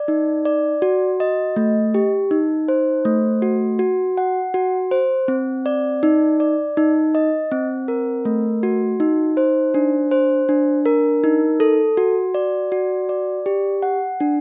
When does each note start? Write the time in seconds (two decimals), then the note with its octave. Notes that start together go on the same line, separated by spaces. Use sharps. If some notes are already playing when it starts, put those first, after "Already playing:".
Already playing: D5
0.08 D#4
0.45 D5
0.82 F#4
1.20 D#5
1.56 A3
1.94 G4
2.31 D#4
2.68 C5
3.05 A3
3.42 F#4
3.79 F#4
4.17 F#5
4.54 F#4
4.91 C5
5.28 C4
5.66 D5
6.03 D#4
6.40 D5
6.77 D#4
7.15 D#5
7.52 C4
7.88 A#4
8.25 A3
8.63 F#4
9.00 D#4
9.37 C5
9.74 D4
10.11 C5
10.49 D4
10.86 A#4
11.24 D#4
11.60 A4
11.97 F#4
12.34 D5
12.72 F#4
13.09 D5
13.46 G4
13.83 F#5
14.20 D4